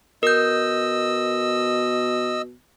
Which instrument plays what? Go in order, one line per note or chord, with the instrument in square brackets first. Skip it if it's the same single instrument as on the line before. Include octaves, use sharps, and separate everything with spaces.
[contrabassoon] B2 [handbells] A#4 G6 [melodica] D#5 E6